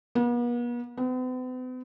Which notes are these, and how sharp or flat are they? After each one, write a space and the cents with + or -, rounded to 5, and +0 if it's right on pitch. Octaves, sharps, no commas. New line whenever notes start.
B3 -45
B3 +45